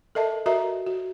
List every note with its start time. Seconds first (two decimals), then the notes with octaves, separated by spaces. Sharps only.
0.15 A4 A#4 D#5 E5 A5
0.46 F#4 A#4 D#5 E5 A#5
0.87 F#4